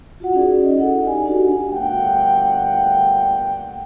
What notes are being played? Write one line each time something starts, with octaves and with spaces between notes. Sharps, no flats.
F4 F#4 F#5
C#4 D#4 F#4 G#4 D5
E4 D#5
D#4 A4 F#5
G4 D5 G#5
D4 F#4 G4
G1 D2 A#2 F#5 G5